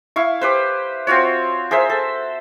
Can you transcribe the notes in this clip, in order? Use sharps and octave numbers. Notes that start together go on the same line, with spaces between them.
E4 F5 C#6
G4 B4 C5
C4 F4 F#4 C#5
G#4 A#4 C5 E5
A4